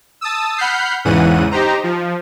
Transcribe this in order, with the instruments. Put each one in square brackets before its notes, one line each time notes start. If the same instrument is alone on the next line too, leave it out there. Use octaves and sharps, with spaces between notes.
[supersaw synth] A5 D#6 E6
F#5 B5 F6 G6 C7
E2 G#2 C#3 E3 F#5 D#7
D#4 G4 C5 A#5
F3